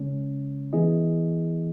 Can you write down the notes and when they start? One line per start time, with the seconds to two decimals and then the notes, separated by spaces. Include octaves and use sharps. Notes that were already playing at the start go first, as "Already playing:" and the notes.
Already playing: C#3 G#3 C#4
0.73 E3 B3 E4 G#4 D#5